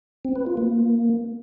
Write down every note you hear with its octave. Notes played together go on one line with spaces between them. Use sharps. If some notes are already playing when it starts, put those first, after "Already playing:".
C4
B4
F4
A#3